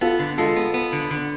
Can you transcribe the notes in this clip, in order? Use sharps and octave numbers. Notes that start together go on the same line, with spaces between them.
B3 F4 A4
D3
G#3 F4 A4
B3
B3
D3
D3